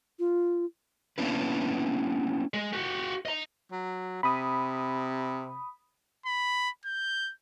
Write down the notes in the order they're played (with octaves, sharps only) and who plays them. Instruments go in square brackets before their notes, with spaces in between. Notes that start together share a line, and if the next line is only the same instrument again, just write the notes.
[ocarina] F4
[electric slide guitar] A#3 B3 C#4 D4 E4 B4
[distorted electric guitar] G#3
F#4 G4
D#5 A#5
[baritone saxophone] F#3
[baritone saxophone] C3 [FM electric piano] B5 D#6
[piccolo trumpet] B5
G6